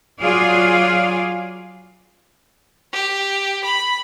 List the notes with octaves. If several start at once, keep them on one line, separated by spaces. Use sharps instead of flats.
F#3 F4 G#4 D5 F5
G4
B5